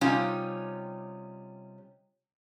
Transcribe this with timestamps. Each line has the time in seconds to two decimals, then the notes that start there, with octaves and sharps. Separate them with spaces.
0.01 C3 G3 C#4 D#4 F4